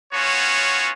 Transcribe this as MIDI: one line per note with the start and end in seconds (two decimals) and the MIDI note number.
0.13 0.91 59
0.13 0.91 61
0.13 0.91 65
0.13 0.91 66
0.13 0.91 73